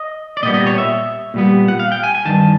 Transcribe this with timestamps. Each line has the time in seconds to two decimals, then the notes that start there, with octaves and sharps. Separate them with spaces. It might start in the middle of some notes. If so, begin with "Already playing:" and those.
Already playing: D#5
0.37 D5
0.43 A#2 D#5
0.45 G3 B3
0.54 D#5
0.67 C#5
0.78 E5
1.34 A#2 G3 B3
1.68 F#5
1.80 F5
1.92 G5
2.04 G#5
2.15 G#5
2.25 G2 D#3 A5